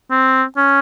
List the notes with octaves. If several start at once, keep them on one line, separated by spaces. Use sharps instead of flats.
C4
C#4